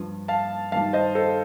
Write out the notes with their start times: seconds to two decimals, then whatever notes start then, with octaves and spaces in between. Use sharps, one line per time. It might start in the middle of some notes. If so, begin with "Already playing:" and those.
Already playing: G2 F3
0.28 F5 A5
0.72 G2 D#3 G3 F5 A5
0.93 C5 D#5
1.15 A4 C5